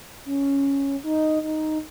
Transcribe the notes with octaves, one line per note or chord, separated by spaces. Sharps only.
C#4
D#4
D#4